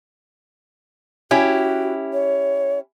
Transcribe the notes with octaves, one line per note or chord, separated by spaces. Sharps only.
C#4 E4 F#4 G4
C#5